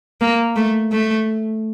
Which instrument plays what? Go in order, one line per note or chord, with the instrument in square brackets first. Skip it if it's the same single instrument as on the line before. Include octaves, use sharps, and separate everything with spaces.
[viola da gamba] A#3
A3
A3